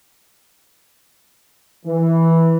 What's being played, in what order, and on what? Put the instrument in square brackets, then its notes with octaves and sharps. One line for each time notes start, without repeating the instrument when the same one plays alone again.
[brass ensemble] E3